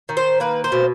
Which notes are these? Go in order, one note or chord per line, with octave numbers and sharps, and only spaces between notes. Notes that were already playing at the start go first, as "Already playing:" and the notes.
D#3
C5
A#3 B4
C5
B2